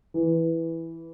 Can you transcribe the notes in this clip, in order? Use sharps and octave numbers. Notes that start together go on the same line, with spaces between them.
E3